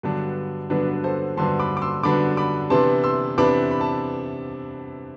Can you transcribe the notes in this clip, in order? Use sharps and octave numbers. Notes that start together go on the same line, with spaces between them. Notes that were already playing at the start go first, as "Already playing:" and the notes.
G2 D3 F#3 B3 D4 B4
G2 D3 F#3 B3 D4 B4
B4
A4 C5
G2 D3 F#3 B3 D4 A5 C6
B5 D6
D6
C6 E6
G2 D3 F#3 B3 D4 B5 D6
B5 D6
C3 E3 B3 D4 A5 C6
C6 E6
C3 E3 B3 D4 B5 D6
B5
A5